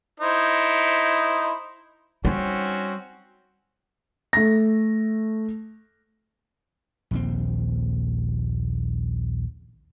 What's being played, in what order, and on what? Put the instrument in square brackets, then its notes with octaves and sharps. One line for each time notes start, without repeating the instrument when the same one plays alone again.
[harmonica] D#4 E4 C5
[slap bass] G3 [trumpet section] C4 C#4 F#4 [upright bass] D#4
[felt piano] A3 A#6
[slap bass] A#1 D#2 C4